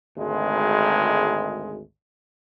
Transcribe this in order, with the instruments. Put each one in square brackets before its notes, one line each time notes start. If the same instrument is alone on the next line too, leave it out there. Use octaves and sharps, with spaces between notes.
[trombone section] G#1 D2 G#3